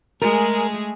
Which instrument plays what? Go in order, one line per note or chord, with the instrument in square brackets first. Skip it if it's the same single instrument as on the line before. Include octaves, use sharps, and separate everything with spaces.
[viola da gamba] G#3 A3 G#4 [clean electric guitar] A#4